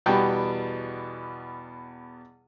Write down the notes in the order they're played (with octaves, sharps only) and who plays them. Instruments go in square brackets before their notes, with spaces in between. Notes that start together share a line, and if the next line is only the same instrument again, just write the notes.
[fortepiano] E2 B2 G3 G5